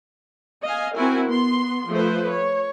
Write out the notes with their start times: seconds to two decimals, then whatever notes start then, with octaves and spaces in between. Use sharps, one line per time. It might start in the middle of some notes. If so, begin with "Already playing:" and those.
0.64 D#5 F5 G#5
0.94 C4 E4 F#4 A#4 G#5
1.29 B3 C6
1.90 F3 A3 B4 C5
2.32 C#5